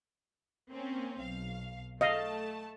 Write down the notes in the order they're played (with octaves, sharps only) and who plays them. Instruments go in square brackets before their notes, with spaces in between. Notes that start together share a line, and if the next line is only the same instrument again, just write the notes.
[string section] A#3 C4 C#4
B1 F5
[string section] A3 A5 [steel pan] D#5 F5